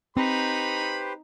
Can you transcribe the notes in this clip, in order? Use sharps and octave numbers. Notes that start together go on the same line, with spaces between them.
C4 D#4 G4 B4 C5 B5